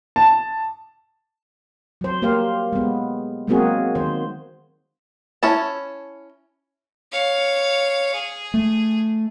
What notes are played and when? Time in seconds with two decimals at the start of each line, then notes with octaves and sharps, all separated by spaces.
0.16 A5
2.01 F#3 C5
2.22 A#3 G4 C5 F5
2.72 G#3 B3
3.47 F#3 G#3 A#3 C4 F#4 G#4
3.95 D#3 C5
5.43 C#4 E4 A5
7.12 C#5 F5
8.14 G#4
8.54 A3